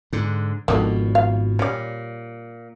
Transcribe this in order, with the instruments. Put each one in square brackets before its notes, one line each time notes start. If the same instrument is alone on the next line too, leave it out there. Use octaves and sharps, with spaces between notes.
[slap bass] G#2 D3
[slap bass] G#1 B2 F3 [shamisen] D3 D#3
[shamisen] F5
[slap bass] A#2 [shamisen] G3 C#4